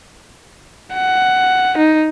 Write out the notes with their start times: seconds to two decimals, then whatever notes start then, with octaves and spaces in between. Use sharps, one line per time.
0.95 F#5
1.78 D#4